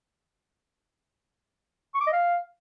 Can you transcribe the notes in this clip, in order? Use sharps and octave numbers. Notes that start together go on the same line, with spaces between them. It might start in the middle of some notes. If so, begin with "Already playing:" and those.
C#6
D6
D#5
F5